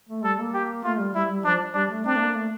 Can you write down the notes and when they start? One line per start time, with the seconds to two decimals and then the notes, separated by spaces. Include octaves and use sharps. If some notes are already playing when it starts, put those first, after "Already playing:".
0.09 A3
0.24 G3 A4
0.39 A#3
0.54 G4
0.84 A3 F4
0.99 G3
1.14 G3 E4
1.30 G3
1.44 F3 D4
1.74 G3 D4
1.90 A3
2.05 C4 D4
2.16 A3
2.20 A#3
2.35 A3